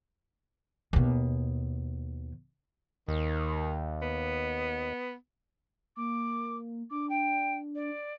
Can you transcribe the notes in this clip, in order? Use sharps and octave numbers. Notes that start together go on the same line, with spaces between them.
D#2 B2
D#2 D#3
B3
A#3 D6
D4 D6
G5
D5